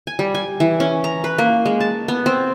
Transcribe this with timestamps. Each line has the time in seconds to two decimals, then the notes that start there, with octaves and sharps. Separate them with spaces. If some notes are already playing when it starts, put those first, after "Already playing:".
0.07 G#5
0.19 G3
0.35 G#5
0.60 E3
0.80 C#4
1.04 A#5
1.24 B4
1.38 A#3
1.66 G#3
1.80 A5
2.08 B3
2.26 C4